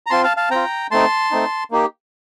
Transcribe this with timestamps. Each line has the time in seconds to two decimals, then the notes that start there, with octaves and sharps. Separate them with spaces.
0.06 A#5
0.10 C4 F4 A5 C6
0.23 F5 A5
0.37 F5 A5
0.50 C4 F4 G5 A#5
0.91 A3 C4 D#4 A5 C6
1.31 A3 C4 D#4
1.71 A#3 D#4 G4